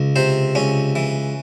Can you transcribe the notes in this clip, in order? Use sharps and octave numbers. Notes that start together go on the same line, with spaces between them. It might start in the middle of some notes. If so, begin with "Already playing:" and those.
Already playing: C#2
C3 C5
C#2 C#4
E3